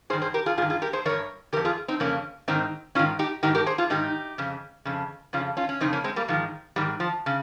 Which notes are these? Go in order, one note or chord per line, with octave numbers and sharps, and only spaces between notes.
G2 D#3 G#4 C5
G#4 C5
G4 A#4
F4 G#4
G2 D#3 F4 G#4
F4 G#4
G4 A#4
G#4 C5
G2 D#3 A#4 C#5
C#3 G4 A#4
F2
F4 G#4
C4 D#4
F2 C#3 A#3 C#4
G#2 D#3 C4 D#4
G#2 D#3 C#4 F4
D#4 G4
G#2 D#3 D#4 G4
G4 A#4
G#4 C5
F4 G#4
G#2 D#3 D#4 G4
F2 C#3
F2 C#3
F2 C#3 C#4 F4
C#4 F4
C#4
F2 C#3 C4 D#4
A#3 C#4
G#3 C4
G3 A#3
G#2 D#3 F3 G#3
G#2 D#3 G3
F3
C#3